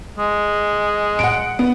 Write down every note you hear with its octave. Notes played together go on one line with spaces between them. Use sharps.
G#3
F#5 D7
B3